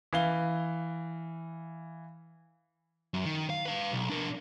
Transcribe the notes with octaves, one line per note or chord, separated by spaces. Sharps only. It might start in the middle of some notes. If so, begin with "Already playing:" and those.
E3 F5 G7
F#2
D#3
F5
B4 F5
B1
D4 A#4